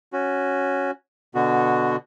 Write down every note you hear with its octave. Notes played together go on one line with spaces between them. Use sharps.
C#4 F#4
B2 D3 B3 F#4